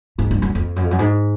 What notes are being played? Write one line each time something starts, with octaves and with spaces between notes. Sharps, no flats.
G#2
G2
F#2
F2
F#2
F2
F#2
G#2